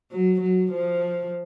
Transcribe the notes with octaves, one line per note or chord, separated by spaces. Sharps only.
F#3
F#3
F3